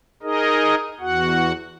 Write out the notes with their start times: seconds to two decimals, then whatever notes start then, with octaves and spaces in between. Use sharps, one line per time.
0.23 D#4 G#4 A#4 D#5
1.00 E2 F#4 F#5